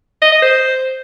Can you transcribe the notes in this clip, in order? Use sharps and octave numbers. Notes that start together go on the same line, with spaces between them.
D#5
D#5
C5